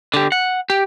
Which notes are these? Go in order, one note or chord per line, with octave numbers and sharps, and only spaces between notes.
D3 G4
F#5
G4